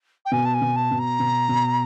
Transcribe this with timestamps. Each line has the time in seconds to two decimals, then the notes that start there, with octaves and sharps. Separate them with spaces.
0.25 G5
0.31 B2 G#5
0.45 A5
0.54 G#5
0.61 B2
0.75 A5
0.91 B2
0.98 A#5
1.20 B2
1.49 B2